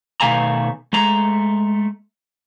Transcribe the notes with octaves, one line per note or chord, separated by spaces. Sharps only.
B2 D#3 A3 F5 G#5 A#5
G#3 A3 A#5